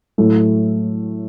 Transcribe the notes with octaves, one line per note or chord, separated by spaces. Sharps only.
A2 F#3 A3 E4